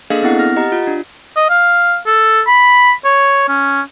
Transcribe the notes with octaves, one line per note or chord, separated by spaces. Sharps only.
A#3 D4 G#4 A4 D#5 F5
B3 C4 E4 F#5
F6 A#6
G4 D#5 F#5 A#5
F4
D4
D#5
F5
A4
B5
C#5
C#4